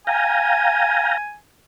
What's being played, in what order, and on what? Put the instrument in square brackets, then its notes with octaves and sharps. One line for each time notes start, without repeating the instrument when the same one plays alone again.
[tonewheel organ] F5 G5 A#5 [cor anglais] G#5